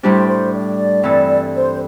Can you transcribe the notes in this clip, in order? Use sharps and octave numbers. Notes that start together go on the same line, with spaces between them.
A2 G3 D4 G4 C5
C5
D5
G2 E3 C4 A4
C5